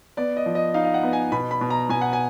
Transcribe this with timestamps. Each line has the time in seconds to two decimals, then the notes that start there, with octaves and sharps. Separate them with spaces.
0.17 B3 D5
0.37 D#5
0.46 F3
0.55 D#5
0.74 D#4 F5
0.85 F5
0.94 F#5
1.03 B3
1.13 G#5
1.32 B2 B5
1.51 B5
1.61 B2
1.70 A#5
1.89 B2 G#5
2.01 F#5
2.13 G#5